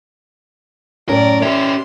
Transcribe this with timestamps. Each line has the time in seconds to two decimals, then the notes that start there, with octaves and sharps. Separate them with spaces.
1.09 F#2 A2 C#4 A#4 D5 G5
1.42 C#4 G4 E5 C6